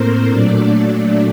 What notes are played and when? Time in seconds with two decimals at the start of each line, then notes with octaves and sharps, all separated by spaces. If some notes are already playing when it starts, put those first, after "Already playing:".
Already playing: A2 A3 A#3 C4 A#4 C5
0.29 A#2 F#3 A3 D4 D5